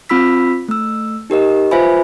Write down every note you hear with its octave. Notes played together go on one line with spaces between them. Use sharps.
C4 F4 B5 E6 B6
A3 E6
D#4 G4 A#4 D#5
F4 B4 C5 E5 G#5 B5